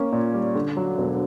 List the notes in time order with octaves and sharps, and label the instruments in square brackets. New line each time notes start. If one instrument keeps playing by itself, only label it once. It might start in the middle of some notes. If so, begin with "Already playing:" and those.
Already playing: [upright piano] A#3 C#4
A#2
G3
D3
F#3
E1